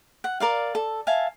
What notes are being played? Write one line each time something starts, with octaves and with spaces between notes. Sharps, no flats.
F#5
A#4 D5 F5
A4
E5 F5 G#5 A5